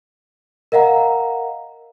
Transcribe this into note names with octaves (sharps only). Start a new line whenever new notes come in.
A#4 D#5 F5 F#5 A#5